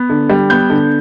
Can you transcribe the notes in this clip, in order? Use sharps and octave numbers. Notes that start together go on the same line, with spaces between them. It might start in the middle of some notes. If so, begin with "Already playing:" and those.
Already playing: B3
D3
G3
B3 G6
D3